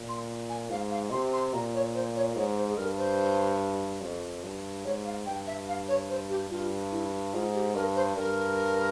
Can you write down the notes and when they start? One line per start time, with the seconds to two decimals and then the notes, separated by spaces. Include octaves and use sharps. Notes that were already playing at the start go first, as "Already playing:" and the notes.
Already playing: A#2
0.09 C6
0.49 G#5
0.70 G#2 F5
0.91 F5
1.11 C3 C6
1.33 C6
1.53 A#2 A#5
1.74 C#5
1.95 C5
2.16 C#5
2.36 G#2 C#5
2.57 C5
2.69 G#4
2.77 G2 A#4
2.98 C5
4.02 F2
4.43 G2
4.85 G#2 C#5
5.05 F5
5.26 G2 G5
5.47 E5
5.68 F5
5.88 C#5
6.09 C5
6.29 G4
6.50 G2 F4
6.91 E4
7.33 G#2 F4
7.54 G4
7.74 G2 A#4
7.95 C5
8.16 G2 A#4